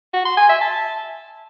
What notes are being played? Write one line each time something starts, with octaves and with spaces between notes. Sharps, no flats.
F#4
C6
G#5
E5
A5